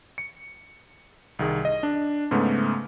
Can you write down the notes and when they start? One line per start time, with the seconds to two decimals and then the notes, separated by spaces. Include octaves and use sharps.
0.18 C#7
1.39 C2 D#3 G#4
1.65 D#5
1.83 D4
2.31 G#2 C#3 A3 B3